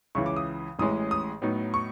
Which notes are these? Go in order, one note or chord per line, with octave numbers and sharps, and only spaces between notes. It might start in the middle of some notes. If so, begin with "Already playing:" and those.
C#2 C#3 E3 C#6
D6
D#6
A1 A2 E3 G#3 C#4 D#6
D#6
A2 F#3 B3 D#4
C#6